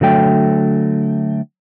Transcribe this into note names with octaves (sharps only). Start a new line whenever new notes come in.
D3 F#3 A3 G5